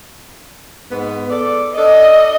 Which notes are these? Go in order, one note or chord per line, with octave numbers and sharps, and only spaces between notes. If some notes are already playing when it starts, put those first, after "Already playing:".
G#2 B3
A4 D5
D4 A4 D5 D#5